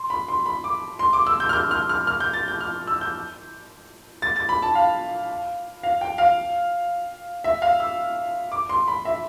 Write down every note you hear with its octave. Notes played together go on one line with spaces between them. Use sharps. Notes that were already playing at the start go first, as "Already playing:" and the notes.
Already playing: C6
B5
C6
B5
D6
C6
D6
E6
G6
F6
G6
F6
F6
F6
G6
A6
G6
F6
E6
G6
A6
A6
B5
A5
F5
F5
G5
F5
E5
F5
E6
D6
C6
B5
E5